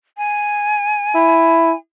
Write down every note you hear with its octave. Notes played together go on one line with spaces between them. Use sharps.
G#5
E4